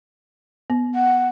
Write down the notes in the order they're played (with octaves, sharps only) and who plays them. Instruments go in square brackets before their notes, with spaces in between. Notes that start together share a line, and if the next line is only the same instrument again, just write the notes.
[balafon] B3
[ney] F#5